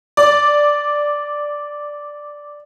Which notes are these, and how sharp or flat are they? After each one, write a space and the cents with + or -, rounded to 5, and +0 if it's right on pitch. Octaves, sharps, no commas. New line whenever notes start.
D5 +0